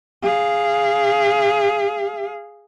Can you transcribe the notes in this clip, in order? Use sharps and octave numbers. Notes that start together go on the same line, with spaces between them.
G#4 F5